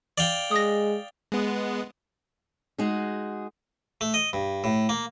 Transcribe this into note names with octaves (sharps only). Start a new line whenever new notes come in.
D5 F5 G5
G#3 D#6 A#6
G#3 B3
G#3 D#4 F#4 G#4
A3
D#5
G2
A2
A#3